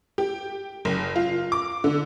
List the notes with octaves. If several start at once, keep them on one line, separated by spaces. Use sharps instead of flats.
G4
F#1
F4
D6
D3